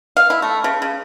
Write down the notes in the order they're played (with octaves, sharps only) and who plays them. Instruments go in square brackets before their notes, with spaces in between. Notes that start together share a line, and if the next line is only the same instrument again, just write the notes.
[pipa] F5
E4
A3
C#3
C#3